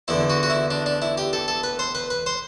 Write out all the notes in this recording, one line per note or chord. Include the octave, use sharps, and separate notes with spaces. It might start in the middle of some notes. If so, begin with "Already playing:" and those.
E2 D3 E4
F#4
F#4
E4
D4
D4
E4
G4
A4
A4
B4
C5
B4
B4
C5